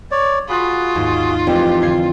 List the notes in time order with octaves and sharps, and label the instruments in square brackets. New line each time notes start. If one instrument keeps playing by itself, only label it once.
[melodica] C#5 D5
[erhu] F4 [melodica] F#4 G#4 [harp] B5 F#6
[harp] D#2 G#2
[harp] A1 G#3 [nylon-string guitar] F2 E3 [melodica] G4
[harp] D3 G#6 C7